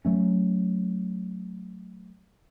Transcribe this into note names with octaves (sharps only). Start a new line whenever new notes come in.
F#3 A3 C#4